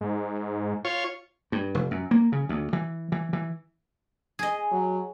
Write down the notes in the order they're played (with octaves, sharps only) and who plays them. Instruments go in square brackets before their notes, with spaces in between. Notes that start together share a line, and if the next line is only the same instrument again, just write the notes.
[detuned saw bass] G#2
[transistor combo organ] F4 C#5
[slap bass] G2
F1
F#2
A#3
C#3
D2
E3
E3
E3
[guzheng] G#4 D#5
[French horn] F#3